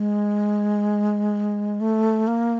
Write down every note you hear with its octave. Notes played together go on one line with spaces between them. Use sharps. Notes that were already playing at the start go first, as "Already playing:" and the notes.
Already playing: G#3
A3
A#3